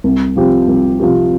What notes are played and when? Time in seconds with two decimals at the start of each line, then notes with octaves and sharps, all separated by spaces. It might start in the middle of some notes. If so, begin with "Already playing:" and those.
0.04 C2
0.36 C3 F3 C4 G4
0.68 C2
1.00 C3 F3 C4 G4